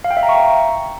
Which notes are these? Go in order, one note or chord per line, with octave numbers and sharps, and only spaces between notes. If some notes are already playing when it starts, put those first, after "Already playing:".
F5
G5
E5
A#5
C#6